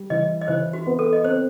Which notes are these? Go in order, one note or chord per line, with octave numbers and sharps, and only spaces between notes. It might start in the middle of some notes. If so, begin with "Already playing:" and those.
Already playing: G3
E3 D#5
D#5
E3 C5
F#4
B3
A4
D#5
C4 C5